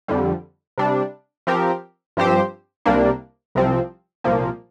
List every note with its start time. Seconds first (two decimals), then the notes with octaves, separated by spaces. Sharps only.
0.08 F2 D3 G3
0.78 C3 G3 D4
1.47 F3 C4 G4 A#4
2.17 G2 F3 C4 G4 C5
2.86 C2 C3 G3 A#3 D4
3.55 C2 C3 F3 C4
4.24 C2 A#2 F3 A#3